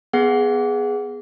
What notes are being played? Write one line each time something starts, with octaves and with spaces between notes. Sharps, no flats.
B3 G#4 F#5